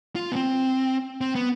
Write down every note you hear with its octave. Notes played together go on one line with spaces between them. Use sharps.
F4
B3
C4
C4
B3